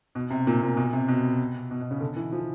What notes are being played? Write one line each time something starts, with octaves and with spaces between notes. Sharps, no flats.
B2
C3
A#2
A#2
B2
C3
B2
B2
B2
C#3
D3
E3
F3